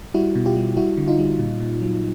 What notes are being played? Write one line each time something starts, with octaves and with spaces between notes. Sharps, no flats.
G3 E4 F#4
B2
F4 G4
G3
G3 E4 F#4
D3
D#4 F4
G3
A#2
A#2
F#3